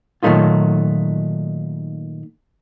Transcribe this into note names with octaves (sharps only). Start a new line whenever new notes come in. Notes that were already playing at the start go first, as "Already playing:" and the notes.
A#2 D#3 F#3 A3 D#4 F4